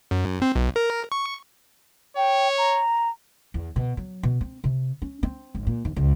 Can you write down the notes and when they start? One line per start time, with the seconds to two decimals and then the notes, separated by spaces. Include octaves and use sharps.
0.11 F#2
0.42 C4
0.56 B1
0.76 A#4
1.12 C#6
2.17 C#5 G5
2.58 A#5
3.54 E2
3.76 B2
3.97 F#3
4.23 B2
4.41 C4
4.64 C3
5.02 C#4
5.23 C4
5.55 G#1
5.67 A#2
5.85 D#2
5.96 C#2